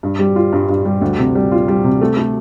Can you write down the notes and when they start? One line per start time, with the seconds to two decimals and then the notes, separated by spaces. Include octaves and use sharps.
0.03 G2
0.19 G3
0.36 F4
0.53 G2
0.69 G2
0.85 G3
1.02 D2
1.18 C3
1.35 G3
1.52 F4
1.68 G3
1.84 C3
2.01 A3
2.17 A3